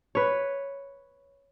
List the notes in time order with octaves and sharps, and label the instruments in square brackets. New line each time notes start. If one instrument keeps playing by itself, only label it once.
[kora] B4 C#5